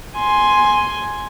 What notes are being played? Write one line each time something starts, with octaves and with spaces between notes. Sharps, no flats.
G#5 C6